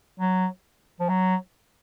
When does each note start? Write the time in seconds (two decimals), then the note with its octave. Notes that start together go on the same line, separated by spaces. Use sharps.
0.20 F#3
1.00 F3
1.09 F#3